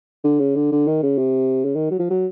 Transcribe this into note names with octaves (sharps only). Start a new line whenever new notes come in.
D3
C#3
D3
D3
D#3
C#3
C3
C#3
D#3
F#3
F3
F#3